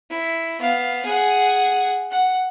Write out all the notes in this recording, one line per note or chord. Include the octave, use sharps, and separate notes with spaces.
E4
B3 F5
G#4 F#5
F#5